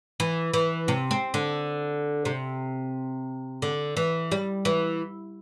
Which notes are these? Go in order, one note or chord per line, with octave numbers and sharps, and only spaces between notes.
E3
E3
C3
C4
D3
C3
D3
E3
G3
E3